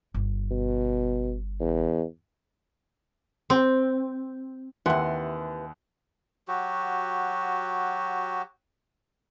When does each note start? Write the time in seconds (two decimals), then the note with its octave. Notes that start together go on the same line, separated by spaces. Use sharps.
0.14 G1
0.51 B2
1.60 E2
3.50 C4
4.86 D#2 C3 E3 F#5 C6
6.48 F#3 F#4 G4